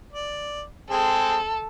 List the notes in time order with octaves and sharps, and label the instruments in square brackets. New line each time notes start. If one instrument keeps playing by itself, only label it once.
[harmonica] D5
[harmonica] G#3 C4 G#4 [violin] A4